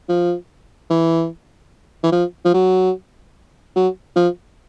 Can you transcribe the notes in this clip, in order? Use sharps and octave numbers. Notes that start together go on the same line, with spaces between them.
F3
E3
E3
F3
F3
F#3
F#3
F3